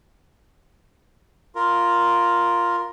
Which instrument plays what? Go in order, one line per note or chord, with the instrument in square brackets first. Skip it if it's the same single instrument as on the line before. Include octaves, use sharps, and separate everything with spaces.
[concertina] F4 A#4